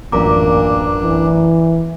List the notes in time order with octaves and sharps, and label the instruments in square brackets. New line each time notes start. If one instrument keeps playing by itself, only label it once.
[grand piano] A1 F#2 [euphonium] A#2 [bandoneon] D4 [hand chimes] A#4 A#5 D6
[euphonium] E3